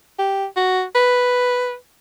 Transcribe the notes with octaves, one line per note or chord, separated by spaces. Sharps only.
G4
F#4
B4